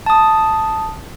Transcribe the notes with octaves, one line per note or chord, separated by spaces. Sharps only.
A5 D#6